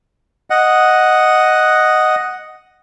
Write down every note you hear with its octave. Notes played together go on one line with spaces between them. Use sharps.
D#5 F#5